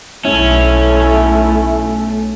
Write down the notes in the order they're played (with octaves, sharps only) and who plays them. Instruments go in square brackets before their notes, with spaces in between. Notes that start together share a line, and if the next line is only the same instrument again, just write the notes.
[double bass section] B1 A3 [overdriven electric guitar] C#4 [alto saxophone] E4